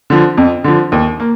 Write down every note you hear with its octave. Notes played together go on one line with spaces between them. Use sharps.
D3 F3
F2
D3 F3
D#2
A#3